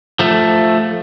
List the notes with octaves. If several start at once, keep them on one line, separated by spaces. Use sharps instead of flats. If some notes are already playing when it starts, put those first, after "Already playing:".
F3 A3